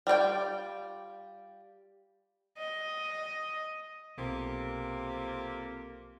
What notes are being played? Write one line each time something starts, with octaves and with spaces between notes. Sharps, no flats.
G3 F4 D5 G5
D#5
B1 F2 C3 A#3